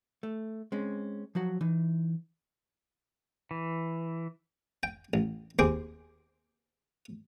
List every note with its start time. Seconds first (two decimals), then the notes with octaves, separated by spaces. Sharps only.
0.23 A3
0.72 G#3 C4 C#4
1.35 F3 F#3 F#4 F#5
1.61 E3 D#4
3.51 E3
4.83 G5
5.14 A1
5.59 D#2 C4 G#4 G5 D6